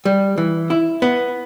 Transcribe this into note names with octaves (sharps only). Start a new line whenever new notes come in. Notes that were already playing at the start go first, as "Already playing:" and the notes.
G3
E3
E4
B3